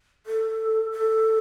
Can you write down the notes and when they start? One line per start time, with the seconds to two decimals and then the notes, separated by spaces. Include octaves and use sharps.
0.26 A4
0.91 A4